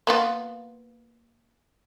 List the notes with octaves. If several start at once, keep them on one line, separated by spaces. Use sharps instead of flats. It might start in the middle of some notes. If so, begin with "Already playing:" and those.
A#3 B3 F4